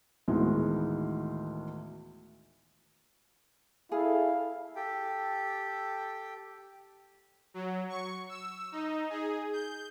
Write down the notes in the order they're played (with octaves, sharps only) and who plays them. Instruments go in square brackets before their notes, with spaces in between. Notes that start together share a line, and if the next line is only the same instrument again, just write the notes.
[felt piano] D2 A2 D#3 E3 G#3 B3
[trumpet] E4 [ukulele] G#4 [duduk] A4 [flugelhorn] F5
[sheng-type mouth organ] G4 A4 G5
[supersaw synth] F#3
C#6
E6
D#4
G#4
G6